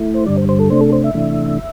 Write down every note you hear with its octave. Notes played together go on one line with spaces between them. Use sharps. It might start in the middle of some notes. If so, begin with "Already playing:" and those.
Already playing: A3 E4
C5
G2 D3 G3 D5
C5
C5
A4
C3 A3 D4 C5
A4
C5
E5
C3 E3 A3 D4